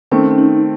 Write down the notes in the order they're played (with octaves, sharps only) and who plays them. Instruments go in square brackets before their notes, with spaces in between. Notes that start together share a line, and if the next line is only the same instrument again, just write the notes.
[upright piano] D#3 A3 C4 [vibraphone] C#4
[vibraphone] C#4
D#4